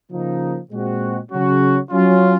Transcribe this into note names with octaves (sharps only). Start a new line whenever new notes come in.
C#3 F3 A#3 D#4
A#2 G#3 C4 F#4
C#3 F#3 C#4 F#4
F#3 C#4 F4